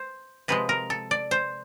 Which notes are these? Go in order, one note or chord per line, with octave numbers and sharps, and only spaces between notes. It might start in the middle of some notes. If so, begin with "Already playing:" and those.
Already playing: C5
C3 F3 G#3 B4
A#4
A4
D5
C5